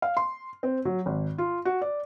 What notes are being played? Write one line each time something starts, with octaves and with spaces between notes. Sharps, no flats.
F5
C6
C4
F#3
G#1
F4
F#4
D5